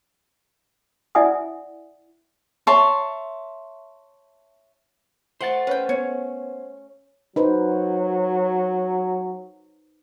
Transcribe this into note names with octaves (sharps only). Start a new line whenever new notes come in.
E4 D5 E5 F#5 G#5 D#6
C#5 E5 A5 C6
A3 C5 F#5 C6 A6
C#4 B4 G5
B3 C#5
F#3 D#4 B4 C5